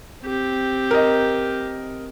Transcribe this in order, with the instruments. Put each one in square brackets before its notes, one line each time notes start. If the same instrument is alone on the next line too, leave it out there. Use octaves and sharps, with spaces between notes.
[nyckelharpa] C4 G4
[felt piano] A#4 D#5